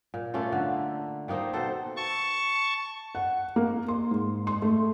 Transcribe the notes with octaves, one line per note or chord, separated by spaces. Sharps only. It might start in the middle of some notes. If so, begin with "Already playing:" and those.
A#2
A3 A#3 C#4 F4
D3
D#3 A#3 D#4 C5
B2 A4 C5
A5 C#6
F#5
A#3
C6
G#2
C6
A3